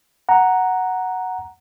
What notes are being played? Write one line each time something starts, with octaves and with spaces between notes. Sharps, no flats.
F#5 A#5